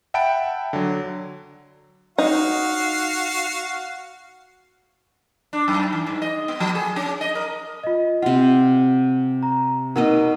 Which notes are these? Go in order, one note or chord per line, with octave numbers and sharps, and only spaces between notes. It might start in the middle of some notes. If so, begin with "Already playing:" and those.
E5 F#5 G5 A5 B5 D7
D3 F#3
D#4 F#4 F5
D4
F#2
E3
G#2
D#5
B3
F3
G#4
C#4
D#5
A#4
F4 D#5
C3 F4 F#5
A#5
B2 A#3 D#4 A#4 D#5 F#5